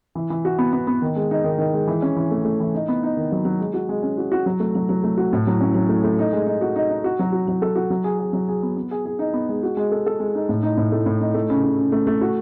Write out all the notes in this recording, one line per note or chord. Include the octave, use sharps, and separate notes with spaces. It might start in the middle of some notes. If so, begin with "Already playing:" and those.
E3
E3
F#4
B3
B3
B3
D#3
G#3
D#4
D#3
D#3
G#3
E3
C#4
E3
A3
A3
E3
D#4
B3
D#4
D#3
F#3
F#3
G#3
F#4
G#3
C#4
F#4
F#4
F#3
A3
F#3
F#3
A3
F#4
A2
F#3
C#4
F#3
A3
A3
D#4
G#3
D#4
F#4
D#4
D#4
F#4
F#3
F#4
F#3
A4
F#4
F#3
G#4
G#4
F#3
G#4
B3
B3
G#4
G#4
D#4
B3
G#3
F#4
G#3
A4
A4
G#3
D#4
A2
D#4
A2
A3
A2
D#4
A3
C#3
C#3
C#3
A3
A3
F#4